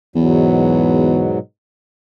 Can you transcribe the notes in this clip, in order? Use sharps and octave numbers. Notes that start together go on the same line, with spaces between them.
E2 G#2 B2 F#3